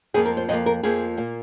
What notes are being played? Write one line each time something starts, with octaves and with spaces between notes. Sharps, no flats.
F2 F3 A#3 G#4
A#4
C5
F2 F3 A#3 D#5
A#4
F2 F3 A#3 G#4
A#2 A#3